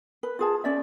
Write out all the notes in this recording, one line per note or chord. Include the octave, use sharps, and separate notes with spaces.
B4
F4 G#4 A5
C#4 D5 E5